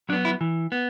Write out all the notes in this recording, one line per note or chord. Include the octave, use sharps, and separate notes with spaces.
F#3 B3 D4
E4
E3
B3